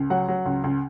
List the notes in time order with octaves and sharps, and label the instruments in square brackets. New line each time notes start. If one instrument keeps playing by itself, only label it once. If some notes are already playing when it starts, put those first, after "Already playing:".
Already playing: [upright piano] C#2
F#3 F#5
F#3
C#2
C#2